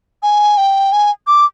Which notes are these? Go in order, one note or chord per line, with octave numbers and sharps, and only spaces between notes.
G#5
G5
G#5
D6